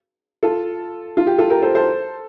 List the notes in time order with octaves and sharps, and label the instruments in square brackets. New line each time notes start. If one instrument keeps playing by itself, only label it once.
[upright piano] F4 A4
F4
G4
F4 A4
G4 A#4
A4 C5
A4 C5